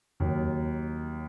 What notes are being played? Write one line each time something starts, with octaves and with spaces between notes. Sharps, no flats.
D#2 D#3 F#3